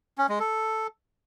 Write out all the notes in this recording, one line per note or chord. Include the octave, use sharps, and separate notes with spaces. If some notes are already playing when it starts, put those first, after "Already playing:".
C#4
G#3
A4